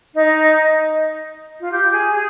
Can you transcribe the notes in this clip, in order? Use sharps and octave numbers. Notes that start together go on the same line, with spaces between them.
D#4
F4
G4
G#4
G#4